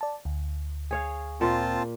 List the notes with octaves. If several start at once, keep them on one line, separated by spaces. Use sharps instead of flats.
D5 A5
D2
G#4 C#5 F5
A#2 C4 F4 A5